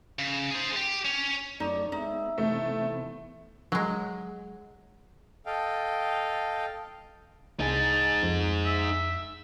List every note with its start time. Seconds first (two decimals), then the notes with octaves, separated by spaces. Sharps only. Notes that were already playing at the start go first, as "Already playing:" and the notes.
0.19 C#3
0.51 G#4 C5
0.76 G4
1.05 C#4
1.60 F#2 A3 D#4 C#5 D5
1.92 G#3 B3 D#4 E5
2.38 C3 E3 A3 B3
3.72 F#3 G#3
5.46 A4 D#5 F5 G5
7.60 C2 D#4 G#4 A5
8.23 F2
8.65 E5